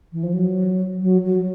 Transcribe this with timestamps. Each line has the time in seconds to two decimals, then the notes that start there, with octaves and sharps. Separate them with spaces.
0.12 E3
0.23 F3
0.33 F#3
1.02 F#3
1.25 F#3